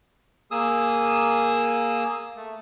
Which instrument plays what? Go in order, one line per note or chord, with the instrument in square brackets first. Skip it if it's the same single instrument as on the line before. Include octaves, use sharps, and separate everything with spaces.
[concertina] A#3 G#4 D#6 E6
A3